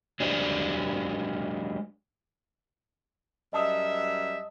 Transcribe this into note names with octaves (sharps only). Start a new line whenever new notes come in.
F#3 G#3 D4 G4 C5 D5
F#2 G3 D#5 E5 A5 D#6